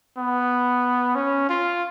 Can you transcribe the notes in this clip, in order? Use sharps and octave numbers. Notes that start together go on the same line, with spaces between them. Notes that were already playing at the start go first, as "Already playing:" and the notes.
B3
C#4
F4